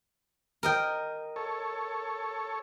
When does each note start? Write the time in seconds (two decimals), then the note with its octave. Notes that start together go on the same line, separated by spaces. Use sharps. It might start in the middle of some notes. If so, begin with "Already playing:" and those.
0.63 A#4 D#5 G5
1.36 A4 C#5